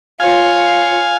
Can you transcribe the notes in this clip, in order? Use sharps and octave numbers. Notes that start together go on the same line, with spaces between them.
F4 C#5 F5 G#5